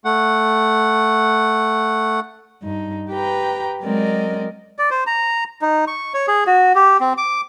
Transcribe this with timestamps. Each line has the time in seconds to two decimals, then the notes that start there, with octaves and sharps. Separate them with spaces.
0.05 A3 F#5
2.63 G2 D#4
3.10 G4 B4 G5 A#5
3.83 F#3 G#3 C4 A#4 D5 D#5
4.79 D5
4.91 C5
5.07 A#5
5.62 D#4
5.87 C#6
6.14 C#5
6.28 G#4
6.47 F#4
6.75 G4
7.00 C4
7.18 D6